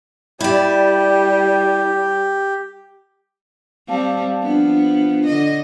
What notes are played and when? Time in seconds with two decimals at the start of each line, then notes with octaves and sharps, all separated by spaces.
0.41 G3 E4 G4 D5
3.88 G3 C4 F5 A5
4.43 F3 B3 D4
5.27 D3 D#5